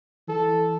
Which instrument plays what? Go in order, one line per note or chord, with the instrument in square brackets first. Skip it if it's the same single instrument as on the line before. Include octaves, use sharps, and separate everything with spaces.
[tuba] E3 [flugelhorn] A4